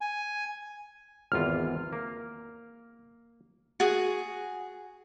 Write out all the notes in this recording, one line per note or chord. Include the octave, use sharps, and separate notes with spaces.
G#5
G#1 E2 F4 F6
A#3
F#4 G#4